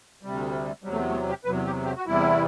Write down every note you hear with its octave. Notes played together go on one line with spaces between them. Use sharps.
D2 C3 G3
E2 C3 F#3 G3
A3
B3
A3
B3
G4
E2 C3 F#3 B4
G4
G4
F#4
E2 C3 G3 E4